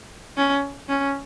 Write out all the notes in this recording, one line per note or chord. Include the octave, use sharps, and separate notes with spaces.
C#4
C#4